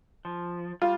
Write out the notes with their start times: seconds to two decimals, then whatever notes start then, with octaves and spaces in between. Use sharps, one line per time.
0.25 F3
0.82 G3 F4